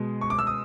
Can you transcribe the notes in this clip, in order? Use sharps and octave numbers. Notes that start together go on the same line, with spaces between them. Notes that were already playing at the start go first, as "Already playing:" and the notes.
Already playing: B2 G#3
C#6
D6
E6
D#6